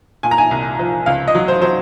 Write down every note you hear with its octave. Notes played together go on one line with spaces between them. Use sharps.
A#2 G#5
A#5
G#5
C2
F3
C#2 F5
D#5
F#3
C5
F#3 C5